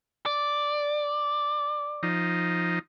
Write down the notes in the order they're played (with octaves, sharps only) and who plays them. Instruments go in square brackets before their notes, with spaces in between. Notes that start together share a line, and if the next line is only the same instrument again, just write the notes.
[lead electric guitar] D5
[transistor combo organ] F3 D#4